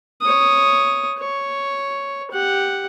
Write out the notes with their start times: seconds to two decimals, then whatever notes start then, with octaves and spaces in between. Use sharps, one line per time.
0.21 C#5 D#6
1.19 C#5
2.31 G4 F#5